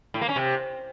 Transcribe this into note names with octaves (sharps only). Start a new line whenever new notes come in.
A2
A#3
C#4
C3